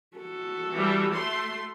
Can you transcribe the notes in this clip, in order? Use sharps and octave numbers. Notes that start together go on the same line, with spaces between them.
F#4 A4
E3 G3
A3 C6